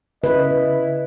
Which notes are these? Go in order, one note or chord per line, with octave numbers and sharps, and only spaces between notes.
C#3 E4 B4 D#5